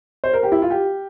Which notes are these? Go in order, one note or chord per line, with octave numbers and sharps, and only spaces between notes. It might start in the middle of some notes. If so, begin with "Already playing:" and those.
C5
A#4
G4
E4
F4
G4